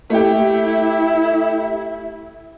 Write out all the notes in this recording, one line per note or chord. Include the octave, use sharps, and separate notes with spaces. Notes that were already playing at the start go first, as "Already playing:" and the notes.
A3 E4 G4